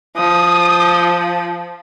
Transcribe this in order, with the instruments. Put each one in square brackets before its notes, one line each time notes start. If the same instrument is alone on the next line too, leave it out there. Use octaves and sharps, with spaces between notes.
[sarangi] F3 [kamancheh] D#6